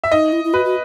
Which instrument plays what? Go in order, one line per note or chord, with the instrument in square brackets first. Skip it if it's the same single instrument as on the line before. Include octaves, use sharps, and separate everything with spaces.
[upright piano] E5
[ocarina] D#4 [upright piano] D#5
[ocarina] E4
E4
[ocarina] F#4 [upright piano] B4
[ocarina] F#4